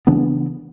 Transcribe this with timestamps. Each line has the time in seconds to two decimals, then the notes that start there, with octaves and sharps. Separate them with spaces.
0.07 C#3 E3 B3 D4